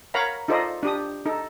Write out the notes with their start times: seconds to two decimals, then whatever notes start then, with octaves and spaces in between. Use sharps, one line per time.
0.14 A#4 C#5 F5 F#5 A#5 B5
0.48 D#4 F4 A4 C5 D5 D#5
0.83 D4 G4 D#6
1.26 D#4 A4